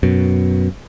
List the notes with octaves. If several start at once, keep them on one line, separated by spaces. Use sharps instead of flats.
F#2 B2